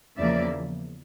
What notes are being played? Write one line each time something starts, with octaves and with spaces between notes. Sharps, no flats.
E2 C#3 F3 A#3 D5 E5